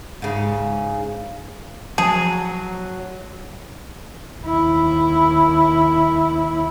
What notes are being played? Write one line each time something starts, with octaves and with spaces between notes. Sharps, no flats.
G#2 C#3
F3 F#3 G#4 A5
D#2 E4